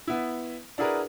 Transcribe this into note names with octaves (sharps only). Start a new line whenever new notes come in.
B3 E4
D4 E4 F#4 G#4 A#4 B4